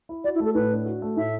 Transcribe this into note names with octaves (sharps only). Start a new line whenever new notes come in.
E4
F#4 D5
E4
A3 A4
A2 B4
D4
F#4
A3
A2 E5